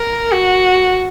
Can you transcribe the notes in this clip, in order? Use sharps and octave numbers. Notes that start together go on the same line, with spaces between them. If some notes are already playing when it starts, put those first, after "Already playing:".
Already playing: A#4
F#4